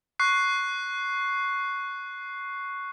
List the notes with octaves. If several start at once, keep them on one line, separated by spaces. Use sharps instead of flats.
C#6 F#6 C7